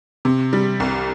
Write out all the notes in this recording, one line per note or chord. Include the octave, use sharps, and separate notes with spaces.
C3
G3
C2